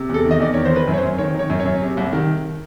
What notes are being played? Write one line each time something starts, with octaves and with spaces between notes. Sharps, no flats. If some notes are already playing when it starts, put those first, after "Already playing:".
Already playing: C3
E2 A4
D#3
D#5
E2 D5
D#3 C#5
C5
D#3 B4
F#2
C#5
C5
F#2
D#3 C#5
D#3 C#5
F#2
C#5
F#2
C3
C2
D#3